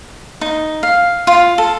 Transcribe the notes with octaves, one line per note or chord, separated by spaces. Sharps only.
D#4
F5
F4
A4